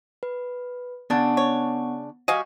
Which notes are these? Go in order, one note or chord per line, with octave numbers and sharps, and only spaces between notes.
B4
C#3 B3 D4 F#5
C#5
G3 F#4 D#5 F5 G#5